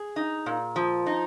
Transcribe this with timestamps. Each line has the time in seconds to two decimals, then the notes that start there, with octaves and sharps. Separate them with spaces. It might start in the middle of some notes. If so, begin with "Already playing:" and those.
Already playing: G#4
0.16 D#4
0.46 A#2
0.76 F3
1.06 D#4